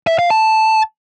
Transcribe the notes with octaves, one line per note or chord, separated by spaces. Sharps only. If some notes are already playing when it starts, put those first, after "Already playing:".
E5
F5
A5